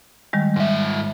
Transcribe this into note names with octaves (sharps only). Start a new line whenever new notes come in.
D#3 G3 G#3
G#2 E5